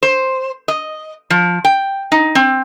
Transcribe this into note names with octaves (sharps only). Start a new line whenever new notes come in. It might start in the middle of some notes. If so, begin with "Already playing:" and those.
C5
D#5
F3
G5
D#4
C4